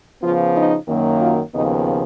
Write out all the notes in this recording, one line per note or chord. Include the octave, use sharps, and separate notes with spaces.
C#3 F3 B3 F4
D#4
F#2 D#3 F#3 A#3
F4
D#2 C#3 F3 B3 D#4